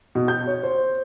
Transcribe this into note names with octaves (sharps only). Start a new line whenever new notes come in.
B2
G6
C#5
C5